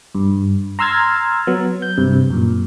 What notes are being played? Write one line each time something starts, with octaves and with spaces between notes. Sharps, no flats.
G2
A#5 C6 E6 F6 G#6 A6
F#3 B3
G6
G2 C3
F#2 A#2